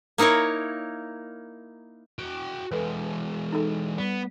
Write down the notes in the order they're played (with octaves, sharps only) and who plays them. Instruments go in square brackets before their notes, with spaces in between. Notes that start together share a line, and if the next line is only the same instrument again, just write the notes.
[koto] A#3 D#4 E4 A#4 C#5
[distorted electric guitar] F#4 G5
[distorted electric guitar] E3 G#3 [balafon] A4 B4
[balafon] D#4 A4
[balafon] G3 [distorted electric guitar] B3